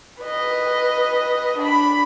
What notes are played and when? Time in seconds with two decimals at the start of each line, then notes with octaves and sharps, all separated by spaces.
0.21 B4 D#5
1.58 D4 B5